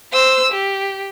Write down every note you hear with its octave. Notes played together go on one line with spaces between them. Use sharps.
C5 E6
G4